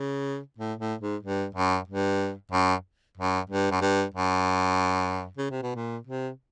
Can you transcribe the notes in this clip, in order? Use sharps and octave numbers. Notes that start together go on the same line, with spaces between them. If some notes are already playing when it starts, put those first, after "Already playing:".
Already playing: C#3
A2
A2
G#2
G2
F#2
G2
F#2
F#2
G2
F#2
G2
F#2
C#3
C3
B2
A#2
C3